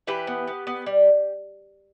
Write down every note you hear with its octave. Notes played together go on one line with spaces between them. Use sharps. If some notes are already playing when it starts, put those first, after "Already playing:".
E3 G4 B4
B3
B3
B3
G3